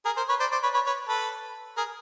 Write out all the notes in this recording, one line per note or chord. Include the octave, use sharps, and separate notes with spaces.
G#4 A#4
A#4 C5
B4 C#5
C5 D5
C5 D5
B4 C#5
B4 C#5
B4 C#5
A4 B4
G#4 A#4